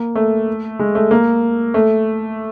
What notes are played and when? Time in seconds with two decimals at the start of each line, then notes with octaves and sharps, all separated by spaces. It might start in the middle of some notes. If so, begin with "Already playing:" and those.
Already playing: A#3
0.16 A3
0.79 G#3
0.95 A3
1.11 A#3
1.74 A3